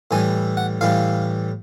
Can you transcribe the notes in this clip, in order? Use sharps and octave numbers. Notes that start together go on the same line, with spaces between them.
A2 E3 G3 G#5
F#5
A2 E3 G3 F5